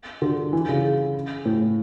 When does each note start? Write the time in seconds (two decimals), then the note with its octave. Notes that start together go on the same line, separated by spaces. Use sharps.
0.22 D3
0.53 E3
0.69 C#3
1.45 A2